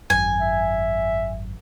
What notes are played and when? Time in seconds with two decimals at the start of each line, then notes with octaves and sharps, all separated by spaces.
0.10 G#1 F#2 G#5
0.41 E5